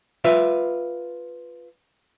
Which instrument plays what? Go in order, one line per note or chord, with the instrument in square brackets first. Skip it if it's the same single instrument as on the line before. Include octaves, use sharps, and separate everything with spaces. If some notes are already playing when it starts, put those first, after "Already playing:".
[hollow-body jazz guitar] F4 B4 E5